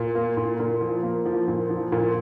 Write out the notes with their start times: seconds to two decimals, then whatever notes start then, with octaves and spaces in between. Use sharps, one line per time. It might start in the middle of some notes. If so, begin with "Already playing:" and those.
Already playing: A#2
0.15 A#3
0.37 A#2
0.60 A#2
0.81 F3
1.03 A#3
1.26 F3
1.48 A#2
1.70 F3
1.92 A#2